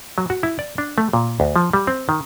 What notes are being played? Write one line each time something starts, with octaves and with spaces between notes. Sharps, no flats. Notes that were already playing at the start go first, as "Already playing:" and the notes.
F#3
F#4
E4
D5
D4
A3
A#2
D2
F3
G3
C4
D#3